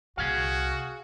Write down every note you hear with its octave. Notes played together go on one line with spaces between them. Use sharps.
C2 A#2 F#4 G#4 F5